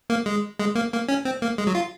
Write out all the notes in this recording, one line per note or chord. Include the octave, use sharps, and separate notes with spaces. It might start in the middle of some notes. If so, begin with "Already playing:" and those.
A#3
G#3
G#3
A#3
A#3
C#4
C4
A#3
G#3
F#3
F4